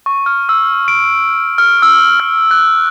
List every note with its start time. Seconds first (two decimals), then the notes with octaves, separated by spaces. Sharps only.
0.06 C#6
0.26 F6
0.49 E6
0.88 D7
1.58 F6
1.82 E6
2.20 F6
2.51 F#6